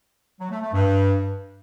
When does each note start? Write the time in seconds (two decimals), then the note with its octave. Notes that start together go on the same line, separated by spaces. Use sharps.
0.39 F#3
0.50 A3
0.62 A3
0.73 G2